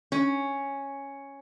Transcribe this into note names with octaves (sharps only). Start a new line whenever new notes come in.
C#4